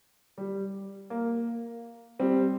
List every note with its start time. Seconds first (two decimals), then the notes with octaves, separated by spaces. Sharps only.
0.38 G3
1.10 A#3
2.19 G3 C4